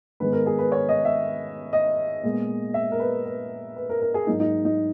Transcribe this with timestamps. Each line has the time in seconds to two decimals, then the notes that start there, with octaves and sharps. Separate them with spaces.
0.20 G#2 D#3 G#3 B3 B4
0.33 A#4
0.46 G#4
0.59 B4
0.72 C#5
0.89 D#5
1.05 E5
1.73 D#5
2.23 A#2 G#3 B3
2.74 E5
2.92 A#4
3.00 B4
3.25 B4
3.76 B4
3.89 A#4
4.02 A#4
4.14 G#4
4.27 G#2 F#3 A#3 D#4
4.40 D#4
4.65 D#4